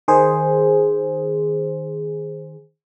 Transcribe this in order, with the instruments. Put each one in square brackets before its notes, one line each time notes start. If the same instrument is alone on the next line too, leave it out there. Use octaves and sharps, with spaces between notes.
[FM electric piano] D#3 G#4 C5